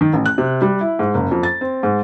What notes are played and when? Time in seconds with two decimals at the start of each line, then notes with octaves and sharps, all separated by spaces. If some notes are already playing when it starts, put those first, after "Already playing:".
0.01 D#3
0.13 A1
0.26 F#6
0.38 C3
0.62 G3
0.81 E4
0.99 G#2
1.14 F#1
1.31 F2
1.43 A6
1.61 C4
1.83 G#2